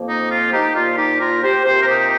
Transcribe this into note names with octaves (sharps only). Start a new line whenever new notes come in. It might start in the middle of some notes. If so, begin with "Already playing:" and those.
Already playing: F2 F3 A#3
D#4
F4
D#4 G4
A#2 F3 A#3 F4
D#4 G4
F4 A#4
G4 C5
C3 F3 A#3 G4 C5
A#4
D#4 G4